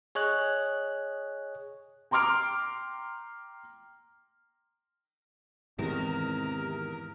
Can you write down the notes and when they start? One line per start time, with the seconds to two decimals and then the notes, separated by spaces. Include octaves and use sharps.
0.15 G#4 C#5 D#5 F#6
2.11 G5 A#5 C6 D6 F6 D7
5.79 E2 G#2 C3 D#3 G#3 A#4